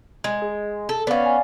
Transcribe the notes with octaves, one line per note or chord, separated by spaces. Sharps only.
G#3
G#4
A4
B3 C#4 D5 F5
G#5